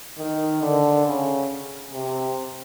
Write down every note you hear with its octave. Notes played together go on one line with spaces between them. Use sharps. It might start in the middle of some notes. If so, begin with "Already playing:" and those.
D#3
D3
C#3
C3